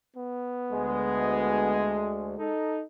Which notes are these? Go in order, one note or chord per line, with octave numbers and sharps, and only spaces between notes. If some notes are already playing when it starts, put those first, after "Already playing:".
B3
D2 G#3
D#4 A4